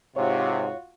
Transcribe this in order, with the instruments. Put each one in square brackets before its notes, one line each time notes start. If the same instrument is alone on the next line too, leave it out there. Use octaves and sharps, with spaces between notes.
[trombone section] G#2 C3 [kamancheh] F4 F#4 [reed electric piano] C#5